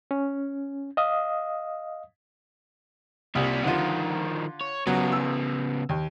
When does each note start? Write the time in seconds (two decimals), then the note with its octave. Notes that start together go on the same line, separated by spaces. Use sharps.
0.11 C#4
0.97 D#5 F5 D#6
3.35 C2 A#2 G3
3.64 D3 D#3 F3 F4
4.61 C#5
4.87 C#3 F#3 B3
5.12 E6
5.89 D#2